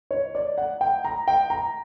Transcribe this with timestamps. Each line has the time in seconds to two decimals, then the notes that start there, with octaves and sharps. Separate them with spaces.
0.11 C#5
0.35 D5
0.58 F#5
0.81 G5
1.04 A#5
1.28 G5
1.50 A#5